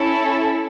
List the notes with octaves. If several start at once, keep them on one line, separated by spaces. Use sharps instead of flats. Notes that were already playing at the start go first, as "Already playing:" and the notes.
Already playing: C#4 E4 A4